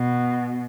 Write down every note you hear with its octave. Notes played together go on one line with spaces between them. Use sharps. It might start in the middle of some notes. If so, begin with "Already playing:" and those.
Already playing: B2